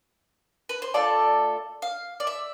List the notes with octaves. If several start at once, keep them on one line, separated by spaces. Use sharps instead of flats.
B4
C5
A3 D4 F4 A4 D5
F5
D5
E5